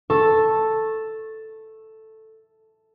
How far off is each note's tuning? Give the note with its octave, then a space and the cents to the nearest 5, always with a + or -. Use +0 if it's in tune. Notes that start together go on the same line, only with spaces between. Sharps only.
A4 +0 C#6 -20